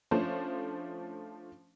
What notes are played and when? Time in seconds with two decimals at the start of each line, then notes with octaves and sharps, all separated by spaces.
0.11 F3 A3 C#4 D4 C5